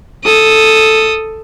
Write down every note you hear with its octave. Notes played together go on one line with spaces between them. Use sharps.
A4 D#6